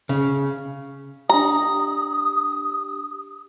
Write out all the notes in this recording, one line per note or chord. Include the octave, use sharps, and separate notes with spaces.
C#3
D4 G4 A#5 D#6